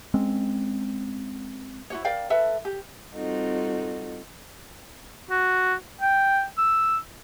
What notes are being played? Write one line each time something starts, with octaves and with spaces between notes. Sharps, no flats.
G#3 C4 C#4
E4 F#4 C#5
A#4 D5 F5 G5
A4 B4 E5
G4
G3 C4 D#4 F4 F#4 A4
F#4
G5
E6